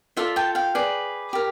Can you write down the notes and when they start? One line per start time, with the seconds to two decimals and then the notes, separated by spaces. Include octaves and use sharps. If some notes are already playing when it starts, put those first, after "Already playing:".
0.17 F4 A4 D5 E5
0.36 G5 A5
0.55 F5 G5
0.75 G#4 B4 D5
1.33 G4 A#4